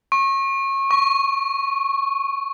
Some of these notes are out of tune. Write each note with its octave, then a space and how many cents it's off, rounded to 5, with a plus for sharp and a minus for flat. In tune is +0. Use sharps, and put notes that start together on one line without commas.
C#6 -30
C#6 +5